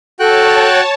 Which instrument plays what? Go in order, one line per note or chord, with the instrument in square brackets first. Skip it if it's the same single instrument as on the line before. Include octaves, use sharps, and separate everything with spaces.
[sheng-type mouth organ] F#4 G5 F#6 [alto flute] A4 [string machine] C#5 A5